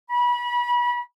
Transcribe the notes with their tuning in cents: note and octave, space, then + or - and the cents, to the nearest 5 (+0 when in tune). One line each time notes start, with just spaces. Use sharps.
B5 -30